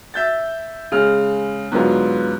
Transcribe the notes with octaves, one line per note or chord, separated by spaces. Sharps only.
E5 G6 A6
C#3 G#3 F6
G#2 D3 F#3 B3 F4